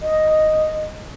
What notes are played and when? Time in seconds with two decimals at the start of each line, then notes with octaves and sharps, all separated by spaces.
0.01 D#5